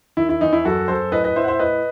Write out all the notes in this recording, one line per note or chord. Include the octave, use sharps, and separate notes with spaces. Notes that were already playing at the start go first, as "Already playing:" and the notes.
D#3 E4
E4
E2 D#4
E4
F#2 F#4 A4
F#2 A4 C5
A2 B4 D#5
B4 D#5
A2 C5 E5
F#5
C5 E5
A2 B4 D#5